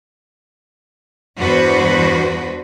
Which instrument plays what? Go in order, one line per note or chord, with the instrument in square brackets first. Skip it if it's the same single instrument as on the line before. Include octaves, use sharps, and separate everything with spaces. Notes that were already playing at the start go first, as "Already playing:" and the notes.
[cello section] E2 G2 D4 F#4 B4 C5